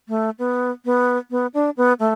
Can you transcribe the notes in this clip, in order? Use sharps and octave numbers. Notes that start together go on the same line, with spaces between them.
A3
B3
B3
B3
D4
B3
A3